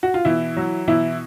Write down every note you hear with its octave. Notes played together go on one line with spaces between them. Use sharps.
F#4
F4
B2 E3 E4
F#3
B2 E3 E4